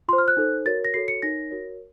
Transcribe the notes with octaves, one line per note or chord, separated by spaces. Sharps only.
F4 C5 C6
F6
F#6
D#4 A4 C5
F#4 A#4 C#5 A6
A#6
F#4 A4 C#5 C7
C#7
D#4 A#4 C#5 A#6
F#4 A#4 C#5